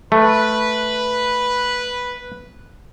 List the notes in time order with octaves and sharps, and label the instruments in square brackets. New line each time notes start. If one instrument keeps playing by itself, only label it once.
[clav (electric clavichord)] A3 [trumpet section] B4